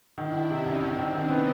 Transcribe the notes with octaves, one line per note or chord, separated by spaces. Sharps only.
D#3 D4 E4
D#3
C3 C#4 D#4
C2
D#3 C4 D4
D#3
D#3 C#4 D#4
B3